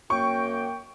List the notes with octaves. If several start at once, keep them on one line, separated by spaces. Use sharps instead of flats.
F#2 A#3 G5 C#6